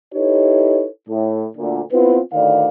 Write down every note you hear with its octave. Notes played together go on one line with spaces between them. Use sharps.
D#4 E4 G4 A4 B4 C#5
A2
D2 A#2 D3
B3 C4 E4 F4 B4
D2 A2 D#3 D5 F5